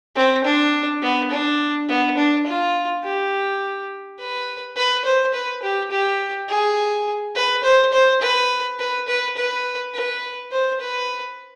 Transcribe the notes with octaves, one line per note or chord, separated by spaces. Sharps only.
C4
D4
B3
D4
B3
D4
F4
G4
B4
B4
C5
B4
G4
G4
G#4
B4
C5
C5
B4
B4
B4
B4
B4
C5
B4